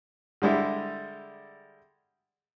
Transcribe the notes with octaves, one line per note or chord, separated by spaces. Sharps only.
D3 G3 G#3 E4